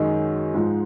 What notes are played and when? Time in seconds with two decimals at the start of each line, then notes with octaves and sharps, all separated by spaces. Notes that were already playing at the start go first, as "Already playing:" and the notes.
Already playing: F#2 D#3 G#3 D#4
0.54 G#2 F3 G#3